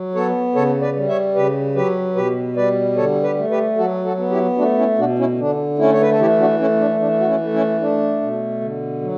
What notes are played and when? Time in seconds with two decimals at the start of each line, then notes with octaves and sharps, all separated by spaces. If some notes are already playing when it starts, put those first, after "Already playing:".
Already playing: F#3
0.15 B3 A4 C#5
0.55 C#3 A4 C#5
0.81 B4 D5
0.96 G3
1.09 C#5 E5
1.35 C#3 G4 B4
1.75 F#3 G4 B4
2.16 B2 G4 B4
2.56 G3 B4 D5
2.97 D3 A4 C#5
3.23 G4 B4
3.37 A3
3.51 G4 B4
3.77 F#3 F#4 A4
4.05 F#4 A4
4.17 B3
4.31 E4 G4
4.58 A3 D4 F#4
4.78 C#4 E4
4.98 B2 D4 F#4
5.18 C#4 E4
5.38 D3 D4
5.78 A3 C#4 E4
5.92 C#5
6.01 B4
6.11 A4
6.19 E3 E4 G4
6.39 D4 F#4
6.59 A3 C#4 E4
6.80 D4
7.00 E3 D4
7.20 F#4
7.27 C#4 E4
7.41 A3
7.53 C#4 E4
7.81 A3 D4
8.21 B2
8.61 D3
9.01 F#3